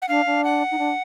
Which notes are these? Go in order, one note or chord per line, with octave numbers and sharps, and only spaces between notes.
F#5
D4 F5
D4
F#5
D#4
D4